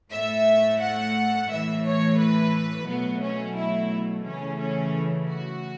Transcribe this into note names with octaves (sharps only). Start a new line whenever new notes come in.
A2 A3 E5
F#5
A2 E3 A3 E5
C#5
B4
B2 F#3 A3 B3
C#4
E4
C#3 E3 A3 C#4
C#4
F#4